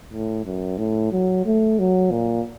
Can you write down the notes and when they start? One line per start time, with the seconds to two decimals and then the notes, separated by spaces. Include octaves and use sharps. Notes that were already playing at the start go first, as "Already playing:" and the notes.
0.13 A2
0.45 F#2
0.78 A2
1.12 F#3
1.46 A3
1.79 F#3
2.11 A#2